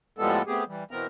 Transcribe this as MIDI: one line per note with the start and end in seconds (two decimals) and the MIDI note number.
0.18 0.42 45
0.18 0.42 53
0.18 0.42 55
0.18 0.42 56
0.18 0.42 59
0.18 0.42 69
0.47 0.64 57
0.47 0.64 59
0.47 0.64 60
0.47 0.64 67
0.47 0.64 68
0.67 0.84 52
0.67 0.84 55
0.91 1.07 47
0.91 1.07 52
0.91 1.07 59
0.91 1.07 60
0.91 1.07 70
0.91 1.07 82